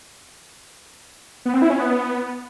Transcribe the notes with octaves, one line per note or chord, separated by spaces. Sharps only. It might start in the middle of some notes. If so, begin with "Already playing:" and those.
B3
C4
E4
C#4
B3